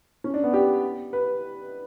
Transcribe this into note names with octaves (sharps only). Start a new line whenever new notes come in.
C#4
D4
B3
G4
B4